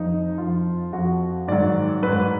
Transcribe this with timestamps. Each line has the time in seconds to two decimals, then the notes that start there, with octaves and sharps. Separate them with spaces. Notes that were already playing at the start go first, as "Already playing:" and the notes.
Already playing: F2 F3 D#4
0.38 F2 F3 F4
0.93 F2 F3 F#4
1.48 G#2 D#3 F#3 D5
2.03 G#2 F#3 B4